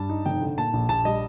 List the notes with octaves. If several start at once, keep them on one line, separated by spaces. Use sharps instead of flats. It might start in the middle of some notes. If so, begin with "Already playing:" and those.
Already playing: G2 A5
D#4
F1 G5
D3
A#2 A5
A#1
A#1 A5
G3 D#5